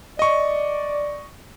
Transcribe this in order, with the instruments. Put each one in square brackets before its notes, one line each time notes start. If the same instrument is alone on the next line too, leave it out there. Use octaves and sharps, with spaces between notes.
[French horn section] D5 [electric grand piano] D#5 C#6